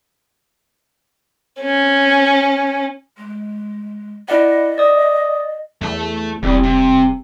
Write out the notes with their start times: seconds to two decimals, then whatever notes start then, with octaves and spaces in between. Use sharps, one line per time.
1.60 C#4
3.17 G#3
4.29 E4 D5 D#5 F#5
4.78 D5 D#6
5.81 E2 A3 A5
6.43 E1 E2 G3 C4
6.63 C3